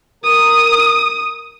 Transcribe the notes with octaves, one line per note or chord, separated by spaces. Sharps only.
A#4 D#6